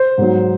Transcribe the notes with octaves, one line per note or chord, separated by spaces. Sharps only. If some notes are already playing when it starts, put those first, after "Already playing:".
Already playing: C5
G#2 F#3